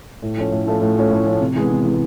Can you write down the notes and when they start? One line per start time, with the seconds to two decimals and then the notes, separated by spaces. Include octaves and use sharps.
0.22 A2
0.37 F3 A3 C#4
0.52 A2
0.66 F3 A3 C#4
0.81 A2
0.96 F3 A3 C#4
1.11 A2
1.26 F3 A3 C#4
1.41 C3
1.55 E3 G#3 B3
1.70 C3
1.85 E3 G#3 B3